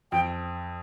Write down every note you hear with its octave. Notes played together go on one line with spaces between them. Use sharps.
F2 G5